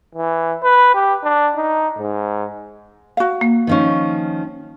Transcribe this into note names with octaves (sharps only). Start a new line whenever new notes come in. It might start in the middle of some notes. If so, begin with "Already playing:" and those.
E3
B4
G4
D4
D#4
G#2
F#4 F5
A#3
D#3 F3 C#4